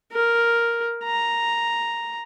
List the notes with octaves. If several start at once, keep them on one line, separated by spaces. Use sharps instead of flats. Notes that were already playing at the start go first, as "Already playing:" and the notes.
A#4
A#5